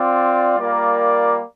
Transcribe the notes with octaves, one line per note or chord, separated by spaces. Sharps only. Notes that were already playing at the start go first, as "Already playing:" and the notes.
Already playing: C4 F4 D5
G3 A#3 F4 A#4 D5